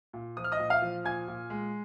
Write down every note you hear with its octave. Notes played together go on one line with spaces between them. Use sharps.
A#2
F3 D#6
F6
D#5 D#6
A#2
F5 F6
F3
A#2 G#5 G#6
A#2
G#3